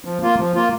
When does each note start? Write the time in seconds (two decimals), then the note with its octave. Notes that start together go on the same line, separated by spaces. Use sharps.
0.05 F3
0.21 A#3 F4
0.39 F3
0.55 A#3 F4